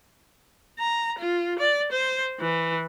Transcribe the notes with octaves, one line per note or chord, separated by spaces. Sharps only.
A#5
F4
D5
C5
E3